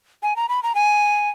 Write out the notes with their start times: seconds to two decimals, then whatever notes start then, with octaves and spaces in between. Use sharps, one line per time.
0.23 G#5
0.36 A#5
0.49 B5
0.63 A#5
0.75 G#5